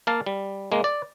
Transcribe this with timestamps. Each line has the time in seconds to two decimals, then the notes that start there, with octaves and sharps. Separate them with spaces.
0.07 A#3 F5 A5
0.26 G3
0.72 G#3 A#3
0.84 D5